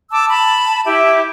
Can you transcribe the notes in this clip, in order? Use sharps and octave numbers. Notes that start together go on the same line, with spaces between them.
A5 D6 E6
A5 B5
E4 G4 E5